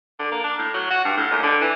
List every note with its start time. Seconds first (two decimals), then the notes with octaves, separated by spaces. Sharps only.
0.19 D3
0.31 A#3
0.44 D4
0.59 A2
0.74 F#3
0.90 F#4
1.05 G2
1.17 A2
1.31 D#2
1.43 D3
1.61 E3